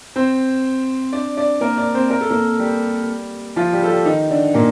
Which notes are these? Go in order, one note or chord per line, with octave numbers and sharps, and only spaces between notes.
C4 C5
D4 D5
D4 D5
A#3 A#4
D4 D5
C4 C5
A#4
A4
A#3 A#4
G3 G4
F3 F4
G3 G4
A4
G3 G4
D#3 D#4
D3 D4
A#2 A#3